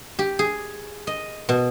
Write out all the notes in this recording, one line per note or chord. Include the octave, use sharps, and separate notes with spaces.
G4
G#4
D#5
B2